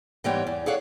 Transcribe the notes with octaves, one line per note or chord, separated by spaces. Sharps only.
G#2 E3 G3 B3 C#5 G5
E2
G#4 A4 C#5 D5 F5 F#5